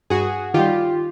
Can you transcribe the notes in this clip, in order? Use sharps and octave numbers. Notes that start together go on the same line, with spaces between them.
G2 F#4 G#4
D#3 G3 F4 G4